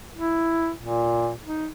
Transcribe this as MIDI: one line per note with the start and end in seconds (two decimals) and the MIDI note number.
0.16 0.70 64
0.82 1.33 46
1.46 1.68 63